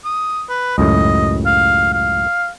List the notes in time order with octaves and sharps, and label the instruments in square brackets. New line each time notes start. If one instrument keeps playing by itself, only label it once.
[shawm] D#6
B4
[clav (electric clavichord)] C#2 F#2 A2 [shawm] D#5
[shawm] F5
F5